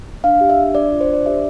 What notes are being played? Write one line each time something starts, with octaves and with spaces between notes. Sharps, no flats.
D4 F5
G4
E5
D4
D4 D5
F4
C5
D4 D5
G4 E5